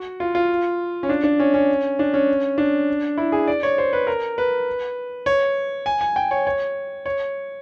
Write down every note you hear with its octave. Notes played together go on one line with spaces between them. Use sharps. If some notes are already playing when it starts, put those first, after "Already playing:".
Already playing: F#4
F4
F4
C#4
D4
D4
C#4
C#4
D4
C#4
D4
E4
G#4
D5
C#5
C5
B4
A#4
B4
C#5
G#5
G#5
G5
C#5
C#5
C#5